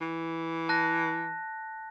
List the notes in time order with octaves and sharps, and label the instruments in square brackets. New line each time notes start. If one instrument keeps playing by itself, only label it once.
[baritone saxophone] E3
[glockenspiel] A5 F#6 A#6